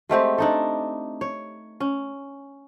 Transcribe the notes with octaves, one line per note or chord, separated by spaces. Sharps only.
G#3 A3 C4 G4
D4 D#4 A4
C#5
C#4